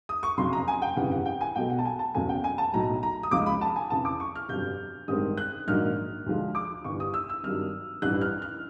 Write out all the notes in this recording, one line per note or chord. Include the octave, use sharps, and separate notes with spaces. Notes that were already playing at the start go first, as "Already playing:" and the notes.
D#6
C#6
F#1 F2 C#3 F#3 C6
A#5
G#5
G5
G1 F2 C#3 E3 F#5
F#5
G5
G#5
B1 B2 F#3 A3 G5
F#5
A5
G#5
A5
F#1 E2 C#3 F#3 A3 G#5
G5
G#5
A5
B1 A2 F#3 A#5
A#5
D#6
C#2 C#3 F3 G#3 D6
B5
A5
G#5
F2 C#3 E3 A5
D6
C#6
F6
G1 F2 D3 F#3 G6
A1 G2 D#3 G#3 C4 D#6
F#6
A#1 G#2 D#3 F#3 F6
D2 D3 F3 G#3
D6
G1 G2 E3 C#6
D#6
E6
E6
G#1 G2 D#3 F#3 F6
A1 G2 E3 F#6
F6
F6